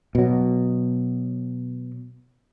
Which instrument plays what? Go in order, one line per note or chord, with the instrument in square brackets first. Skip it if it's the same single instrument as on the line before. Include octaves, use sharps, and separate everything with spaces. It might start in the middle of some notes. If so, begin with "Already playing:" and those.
[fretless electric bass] B2 F#3